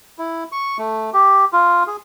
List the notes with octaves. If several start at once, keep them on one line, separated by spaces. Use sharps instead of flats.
E4
C#6
A3
G4
F4
G#4